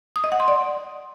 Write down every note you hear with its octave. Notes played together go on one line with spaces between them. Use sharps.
D#6
D#5
F#5
C6
D5